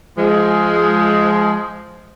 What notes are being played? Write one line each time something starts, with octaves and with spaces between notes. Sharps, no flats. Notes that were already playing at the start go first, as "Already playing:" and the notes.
F3 G#3